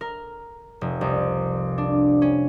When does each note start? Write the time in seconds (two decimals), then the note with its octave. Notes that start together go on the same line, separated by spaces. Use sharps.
0.01 A#4
0.81 F1
1.01 C2
1.78 D4
2.22 C#4